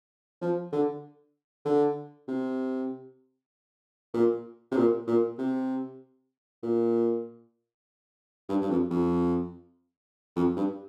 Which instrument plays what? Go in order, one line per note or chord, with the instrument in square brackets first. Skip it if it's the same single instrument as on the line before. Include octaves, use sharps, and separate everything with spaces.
[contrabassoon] F3
D3
D3
C3
A#2
C3
A#2
A#2
C3
A#2
G2
G2
F2
F2
F2
G2